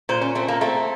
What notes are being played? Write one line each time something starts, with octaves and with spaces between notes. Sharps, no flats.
A#2 C5
C#4
A3 C4
A#3
A3 C4